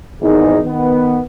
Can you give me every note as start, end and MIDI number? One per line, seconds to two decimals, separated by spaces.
0.21 0.57 32
0.21 0.57 40
0.21 0.57 44
0.21 0.57 51
0.21 0.57 63
0.64 1.18 51
0.64 1.18 59